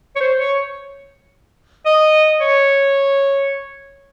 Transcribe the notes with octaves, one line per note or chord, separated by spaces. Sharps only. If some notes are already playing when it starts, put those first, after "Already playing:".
C#5
C5
C#5
D#5
C#5